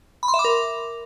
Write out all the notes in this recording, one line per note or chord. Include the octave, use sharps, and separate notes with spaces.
B5
C6
E5
D6
A#4